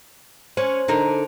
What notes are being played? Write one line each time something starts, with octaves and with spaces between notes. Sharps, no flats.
C#4 C5
D3 D#4 A#4